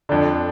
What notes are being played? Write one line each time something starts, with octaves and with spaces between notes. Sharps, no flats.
F2 D3 D4